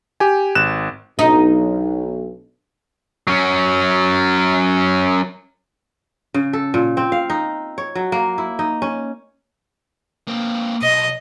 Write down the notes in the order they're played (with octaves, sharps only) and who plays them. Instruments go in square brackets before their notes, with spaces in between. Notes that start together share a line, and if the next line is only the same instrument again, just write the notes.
[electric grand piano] G4 G#5
G#1 F#6 E7
[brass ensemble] B1 [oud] D#4
[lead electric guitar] F#3 C#4
[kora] C#3
A4
A#2
C4
F5
D#4
C#5
F#3
A#3
E4
D#4
C#4
[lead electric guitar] A#3 C4
[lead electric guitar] B1 [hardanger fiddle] D#5